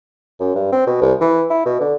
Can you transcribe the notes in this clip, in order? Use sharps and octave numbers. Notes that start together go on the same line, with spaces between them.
F#2
G2
C4
B2
C2
E3
E4
B2
D3